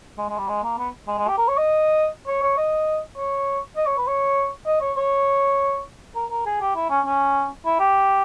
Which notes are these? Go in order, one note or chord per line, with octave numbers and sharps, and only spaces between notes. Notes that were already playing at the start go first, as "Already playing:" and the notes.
G#3
G#3
G3
G#3
A#3
B3
G#3
G#3
G4
A#4
C#5
D#5
C#5
C#5
D#5
C#5
D#5
C#5
B4
C#5
D#5
C#5
C#5
A#4
A#4
G#4
G4
E4
C#4
C#4
E4
G4